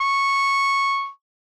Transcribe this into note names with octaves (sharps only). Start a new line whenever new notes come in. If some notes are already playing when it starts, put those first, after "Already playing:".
C#6